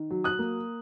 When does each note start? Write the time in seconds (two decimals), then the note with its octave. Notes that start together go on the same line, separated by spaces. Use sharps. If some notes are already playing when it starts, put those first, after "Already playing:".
Already playing: D#3
0.10 F#3
0.24 D#6 F#6
0.39 A#3